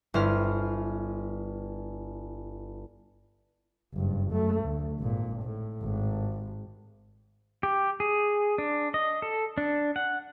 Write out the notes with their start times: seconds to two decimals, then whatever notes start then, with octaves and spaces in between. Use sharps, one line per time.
0.14 G1 E4 C5 F6
3.94 F#1 G2
4.31 F#2 A3
4.64 D2
5.00 G#1 A#2
5.42 A2
5.82 G#1
7.63 G4
8.00 G#4
8.58 D4
8.94 D#5
9.22 A4
9.58 D4
9.96 F#5